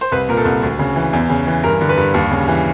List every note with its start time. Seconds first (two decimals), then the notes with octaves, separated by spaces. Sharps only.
0.01 C5
0.12 C2 B4
0.29 A#2 A#4
0.37 A4
0.45 C2
0.63 D2
0.79 C#3
0.96 E3
1.13 E2
1.30 C#3
1.47 E3
1.63 G2 A#4
1.81 D3
1.89 B4
1.97 G2
2.14 D#2
2.31 C#3
2.48 E3